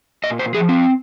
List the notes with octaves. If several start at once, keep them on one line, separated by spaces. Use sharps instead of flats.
A#2 D#5
C5
F3 G#4
C4